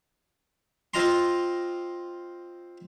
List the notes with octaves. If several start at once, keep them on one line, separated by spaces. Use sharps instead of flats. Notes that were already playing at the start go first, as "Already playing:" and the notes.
C4 F4 D#5 A#5 C6